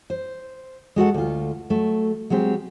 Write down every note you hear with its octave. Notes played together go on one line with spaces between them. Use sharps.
C5
G#3 F#4 A4 F#5
D2 F4
F#3 A3
F#3 G#3 C4 G4